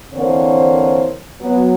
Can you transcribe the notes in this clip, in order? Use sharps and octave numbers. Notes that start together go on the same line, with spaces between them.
D3 E3 A#3 C4 C5 C#5
F#3 B3